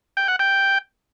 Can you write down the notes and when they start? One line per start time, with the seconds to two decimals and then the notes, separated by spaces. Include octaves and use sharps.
0.17 G5
0.28 F#5
0.39 G5